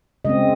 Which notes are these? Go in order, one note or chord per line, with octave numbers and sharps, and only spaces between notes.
C#3 G#3 C4 D#5